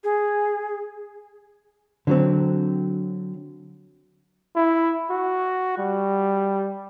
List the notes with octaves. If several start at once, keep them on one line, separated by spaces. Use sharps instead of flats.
G#4
D3 F#3 C4
E4
F#4
G3